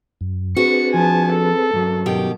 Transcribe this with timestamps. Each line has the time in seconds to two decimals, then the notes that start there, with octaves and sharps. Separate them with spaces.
0.21 F#2
0.57 C4 D4 F#4 G#4 B4 C#7
0.94 F3 G#5 A5
1.33 A4
1.73 G2 F#3
2.06 B2 D#3 G4